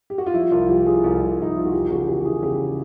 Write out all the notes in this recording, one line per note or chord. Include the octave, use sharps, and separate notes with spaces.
G4
F#4
F4
F3 E4
C2 F4
F3 G4
F3 G#4
C2
C2
C2 D#4
E4
F3 F4
F#4
E2 G4
C#3 F#4
E3 G4
E3 G#4
C#3 G4